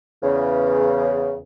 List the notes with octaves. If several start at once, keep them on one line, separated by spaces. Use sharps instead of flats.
E2 C#3